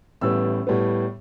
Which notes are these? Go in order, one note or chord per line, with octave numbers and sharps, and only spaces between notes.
A1 A2 G3 B3 E6
A2 G3 B3